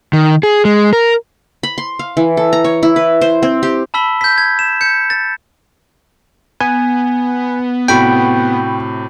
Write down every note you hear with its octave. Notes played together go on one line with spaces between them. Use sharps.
D#3
G#4
G#3
A#4
B5
C6
F5
E3
A4
A#5
C#5
E4
B4
C5
C4
G4
A5 B5 E6 B6 G7
G6 B6
G#6
E7
G6 C#7
A6
B3 G#5
A2 C3 F#4 G5 B5 C#6